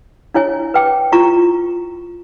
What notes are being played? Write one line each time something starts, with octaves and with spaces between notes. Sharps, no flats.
D4 E4 C#5 G#5
B4 G5 D6
E4 F4 A#5 C#6